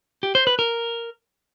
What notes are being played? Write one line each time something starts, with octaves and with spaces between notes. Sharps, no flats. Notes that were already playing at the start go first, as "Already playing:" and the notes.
G4
C5
B4
A#4